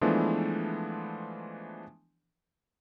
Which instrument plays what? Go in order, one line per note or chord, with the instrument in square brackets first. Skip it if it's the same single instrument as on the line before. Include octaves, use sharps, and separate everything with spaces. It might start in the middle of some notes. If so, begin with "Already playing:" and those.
[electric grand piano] E3 F3 G#3 A3 B3 D4